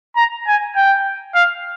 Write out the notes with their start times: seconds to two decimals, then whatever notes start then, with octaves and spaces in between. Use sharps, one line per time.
0.16 A#5
0.47 G#5
0.76 G5
1.35 F5